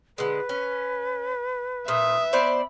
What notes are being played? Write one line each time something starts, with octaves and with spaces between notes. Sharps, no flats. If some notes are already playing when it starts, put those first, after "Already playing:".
D3 G#3 B4
C#4
A#2 E5 D#6
B3 C5 D5 B5